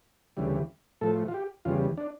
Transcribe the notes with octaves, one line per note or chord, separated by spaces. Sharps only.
D2 C#3 E3 G3
A2 F3 A4
F4
G4
E2 C#3 G3 F4
D4